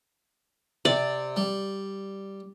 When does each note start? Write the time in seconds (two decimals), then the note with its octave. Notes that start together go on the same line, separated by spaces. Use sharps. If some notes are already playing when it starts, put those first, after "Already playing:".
0.85 C3 D5
1.36 G3